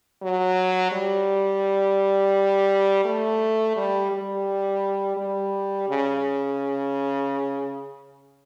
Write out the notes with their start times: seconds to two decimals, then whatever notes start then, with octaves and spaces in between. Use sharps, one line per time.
0.22 F#3
0.92 G3
3.05 A3
3.76 G3
4.12 G3
5.17 G3
5.89 C#3